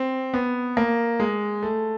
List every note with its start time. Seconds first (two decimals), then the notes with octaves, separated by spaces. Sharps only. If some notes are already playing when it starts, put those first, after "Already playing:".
Already playing: C4
0.34 B3
0.77 A#3
1.20 G#3
1.63 A3